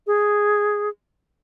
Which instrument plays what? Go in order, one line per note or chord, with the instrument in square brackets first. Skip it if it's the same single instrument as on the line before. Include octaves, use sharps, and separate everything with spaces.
[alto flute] G#4